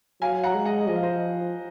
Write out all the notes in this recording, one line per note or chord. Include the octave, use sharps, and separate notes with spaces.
F#3 F5 G#5
F#5 A#5
G#3
D#5 F#5
F3 D#5
F5
C5 D#5